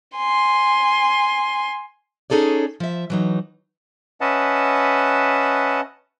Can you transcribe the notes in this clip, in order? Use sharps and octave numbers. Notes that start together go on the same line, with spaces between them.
G#5 C6
C#4 D#4 G#4 A4 C#5 D5
F3 E5
E3 F#3 D#4
C#4 B4 D#5 E5 F#5 A5